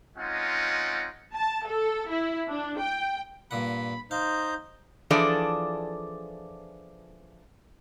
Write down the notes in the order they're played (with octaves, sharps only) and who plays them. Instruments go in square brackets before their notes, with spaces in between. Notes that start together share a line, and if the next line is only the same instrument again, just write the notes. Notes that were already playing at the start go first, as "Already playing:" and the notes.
[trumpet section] G#3 C4 C#4 D#4 F4 F#5
[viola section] A5
A4
E4
D4
G5
[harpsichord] G2 A#2 F#5 [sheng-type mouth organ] B5
[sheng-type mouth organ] D#4 C5 G6 [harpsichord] F5
[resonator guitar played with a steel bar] E3 F3 D4 G#4 A4 D5